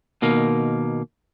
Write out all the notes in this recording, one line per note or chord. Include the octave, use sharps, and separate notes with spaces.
B2 D#3 A#3